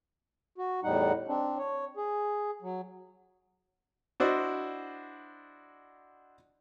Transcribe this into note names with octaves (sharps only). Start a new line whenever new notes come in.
F#4
E2 A2 G3 D#4 F#5
C4 D4
C#5
G#4
F#3
D4 E4 F#4 C5 D5 D#5